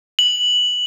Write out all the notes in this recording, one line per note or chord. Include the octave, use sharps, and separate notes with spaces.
F#7